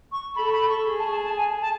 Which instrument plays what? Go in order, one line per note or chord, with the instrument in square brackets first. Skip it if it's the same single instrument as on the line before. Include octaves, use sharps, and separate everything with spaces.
[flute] C#6
[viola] A4 [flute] B5
[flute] B5
C#6
[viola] G#4
[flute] A5
A5
A5
G#5
A5